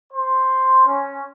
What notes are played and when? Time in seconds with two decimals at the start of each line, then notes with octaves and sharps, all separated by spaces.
0.13 C5 C6
0.86 C#4